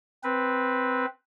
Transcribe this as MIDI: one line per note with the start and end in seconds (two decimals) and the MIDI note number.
0.24 1.06 60
0.24 1.06 71